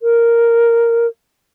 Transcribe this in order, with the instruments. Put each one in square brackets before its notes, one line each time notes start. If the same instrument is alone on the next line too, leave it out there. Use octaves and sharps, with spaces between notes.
[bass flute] A#4